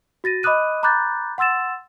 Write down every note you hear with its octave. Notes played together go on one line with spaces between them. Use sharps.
F#4 A6 A#6 D#7
D#5 B5 D6 D#6 F#6 D#7
A#5 B5 D6 F#6 G6 A6
F#5 C6 E6 A6 E7